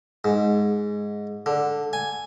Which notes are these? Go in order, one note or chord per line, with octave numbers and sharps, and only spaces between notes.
G#2
D3
G#5